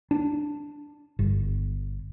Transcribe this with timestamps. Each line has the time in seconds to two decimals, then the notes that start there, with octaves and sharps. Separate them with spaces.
0.11 D4
1.19 G1